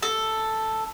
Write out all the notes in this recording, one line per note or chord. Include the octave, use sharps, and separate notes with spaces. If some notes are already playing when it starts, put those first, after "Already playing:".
A4